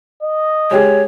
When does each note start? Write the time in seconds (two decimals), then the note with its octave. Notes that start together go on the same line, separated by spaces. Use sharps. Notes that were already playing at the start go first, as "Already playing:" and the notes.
0.22 D#5
0.71 G#3 G4 G#4 C#5